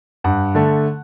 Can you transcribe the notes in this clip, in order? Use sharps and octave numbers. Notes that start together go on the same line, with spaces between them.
G2 F#5
D3 A3